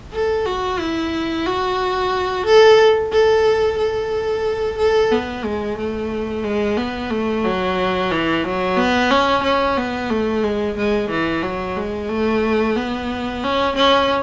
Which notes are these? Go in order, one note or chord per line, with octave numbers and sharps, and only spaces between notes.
A4
F#4
E4
F#4
A4
A4
A4
A4
B3
G#3
A3
G#3
B3
A3
F#3
E3
F#3
B3
C#4
C#4
B3
A3
G#3
G#3
E3
F#3
G#3
A3
B3
C#4
C#4